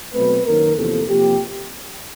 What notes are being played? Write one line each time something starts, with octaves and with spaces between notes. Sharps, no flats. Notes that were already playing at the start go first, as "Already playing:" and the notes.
B2 F#3 A3 C4 B4
F#2 D#3 F#3 A#3 A#4
E2 C3 F3 A#3 A4
C3 F3 A#3 G4